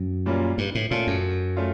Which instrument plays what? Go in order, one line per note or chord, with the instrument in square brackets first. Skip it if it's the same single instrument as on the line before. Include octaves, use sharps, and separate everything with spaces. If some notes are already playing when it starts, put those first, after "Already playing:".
Already playing: [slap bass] F#2
[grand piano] A#2 G3 A#3 C#4 F4
[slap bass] G2
A2
[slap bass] A#2 [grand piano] A3 C#4 F4 A4
[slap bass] F#2
[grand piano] A3 C#4 F4